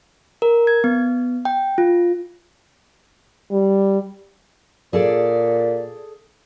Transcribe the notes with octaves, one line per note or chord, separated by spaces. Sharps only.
A#4
G#6
B3
G5
F4
G3
A#2 G#4 A4 D5